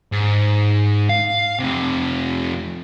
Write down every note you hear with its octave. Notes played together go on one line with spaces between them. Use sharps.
G#2
F5
F2 C3